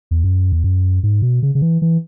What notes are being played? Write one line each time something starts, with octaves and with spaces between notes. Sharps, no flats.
E2
F#2
E2
F#2
G#2
B2
C#3
C#3
E3
E3